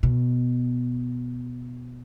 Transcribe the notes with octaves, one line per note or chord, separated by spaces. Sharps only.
B2